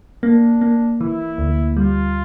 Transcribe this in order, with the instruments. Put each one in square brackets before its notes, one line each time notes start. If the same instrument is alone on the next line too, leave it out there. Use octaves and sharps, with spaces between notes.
[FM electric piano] A#3 [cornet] D4
[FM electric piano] A#3
[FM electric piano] E3 [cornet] E4
[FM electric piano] D2
[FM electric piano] G3 [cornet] F4